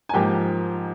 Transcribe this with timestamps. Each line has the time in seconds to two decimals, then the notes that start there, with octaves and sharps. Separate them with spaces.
0.09 G#5
0.13 G#2 F3 A#3 G4 G5